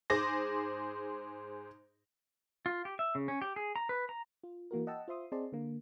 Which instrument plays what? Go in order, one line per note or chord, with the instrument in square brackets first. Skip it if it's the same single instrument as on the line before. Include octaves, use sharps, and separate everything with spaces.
[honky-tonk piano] G#2 G#4 C5 C6 D6 A#6
[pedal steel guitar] F4
G4
E5
C#3
C#4
G4
G#4
A#5
B4
A#5
[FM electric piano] F4
E3 A#3 F#4 A#4
D#5 F#5 G5 A5 E6
F4 C5 E5 C6 D#6
C4 G#4 D5 D#5 A5 C6
D3 A#3